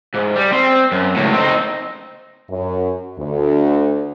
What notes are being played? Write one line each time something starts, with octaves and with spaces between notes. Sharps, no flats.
G#2
G3
C4
F#2
C#2 A2
C4 D#4
F#2
D2